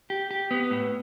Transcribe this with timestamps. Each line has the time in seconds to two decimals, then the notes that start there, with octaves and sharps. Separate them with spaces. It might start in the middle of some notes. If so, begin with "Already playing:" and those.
0.10 G4
0.31 G4
0.51 B3
0.71 A2